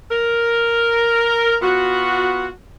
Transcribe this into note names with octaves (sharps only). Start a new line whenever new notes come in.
A#4
B3 F4 F#4